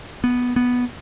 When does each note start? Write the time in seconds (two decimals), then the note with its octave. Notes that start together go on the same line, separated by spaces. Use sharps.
0.24 B3
0.56 B3